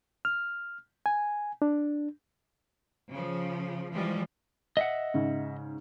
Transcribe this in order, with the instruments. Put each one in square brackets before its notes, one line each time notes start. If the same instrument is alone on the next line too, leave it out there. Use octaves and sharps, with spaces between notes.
[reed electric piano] F6
G#5
D4
[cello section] C#3 F3
E3 F3 G3 G#3
[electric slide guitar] D#5 E5 F#5
[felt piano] G#2 C#3